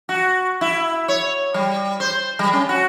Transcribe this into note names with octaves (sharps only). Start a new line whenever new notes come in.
F#4
E4
C#5
G3
C5
G3
C#4
F#4